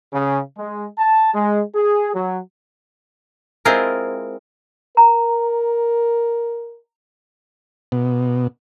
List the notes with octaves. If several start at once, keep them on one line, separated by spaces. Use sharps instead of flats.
C#3
G#3
A5
G#3
G#4
F#3
G#3 C4 E4 F4 G#4 A#4
A#4 A#5
B2